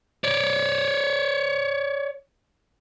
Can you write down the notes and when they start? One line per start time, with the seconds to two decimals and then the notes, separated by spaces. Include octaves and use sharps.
0.24 C#5 D5